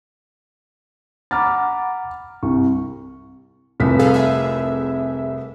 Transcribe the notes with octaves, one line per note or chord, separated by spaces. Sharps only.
F#5 A#5 B5 D6 F6 A6
C2 C#6
F1 C2 B6
G#4 A4 F5
G#4 E5